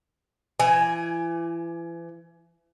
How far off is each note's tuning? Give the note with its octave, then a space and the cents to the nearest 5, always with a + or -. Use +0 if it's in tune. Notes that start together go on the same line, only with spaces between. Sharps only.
E3 +35 G#5 +0